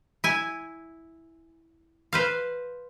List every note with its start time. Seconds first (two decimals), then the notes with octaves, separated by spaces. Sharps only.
0.24 E4 G#5
2.13 B4 C5 F5